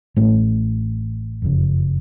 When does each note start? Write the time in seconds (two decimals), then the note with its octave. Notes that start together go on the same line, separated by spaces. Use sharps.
0.16 A1 A2 A3
1.42 F#1 F2 C#3